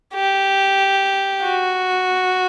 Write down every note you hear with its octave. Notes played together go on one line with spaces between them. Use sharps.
G4
F#4